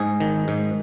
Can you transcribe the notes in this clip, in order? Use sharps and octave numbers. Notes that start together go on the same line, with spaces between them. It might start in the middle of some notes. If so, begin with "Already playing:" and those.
Already playing: G#2 G#4
D#3
G#2